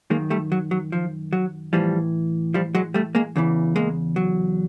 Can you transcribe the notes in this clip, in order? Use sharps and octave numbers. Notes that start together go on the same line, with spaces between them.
F#2 D#3 G#3 A#3
G3 A3
F#3
F#3
F3
F#3
A2 E3 F3 G3
F3 G3
F#3 G#3
G3 A3
G#3 A#3
E2 C#3 E3
G#3 A#3
F#3